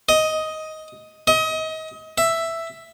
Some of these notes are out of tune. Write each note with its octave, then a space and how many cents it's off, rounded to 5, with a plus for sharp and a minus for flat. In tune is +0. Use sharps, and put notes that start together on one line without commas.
D#5 +10
D#5 +30
E5 +5